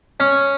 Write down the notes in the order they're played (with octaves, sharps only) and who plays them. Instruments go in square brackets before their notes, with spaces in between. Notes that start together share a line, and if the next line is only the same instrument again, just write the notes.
[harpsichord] C#4